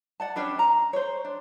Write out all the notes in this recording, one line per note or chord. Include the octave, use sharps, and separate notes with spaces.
D5 F#5 A5
C#4 D4 G4 B4
A#5
C5 C#5
D4